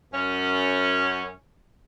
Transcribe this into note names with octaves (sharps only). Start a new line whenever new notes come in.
F#2 C#4